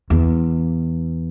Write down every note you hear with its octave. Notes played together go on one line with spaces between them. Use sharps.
E2